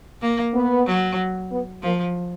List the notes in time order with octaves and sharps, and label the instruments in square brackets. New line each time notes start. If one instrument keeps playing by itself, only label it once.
[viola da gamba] A#3
[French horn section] B3
[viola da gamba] F#3
[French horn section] B3
[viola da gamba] F3 [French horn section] A#3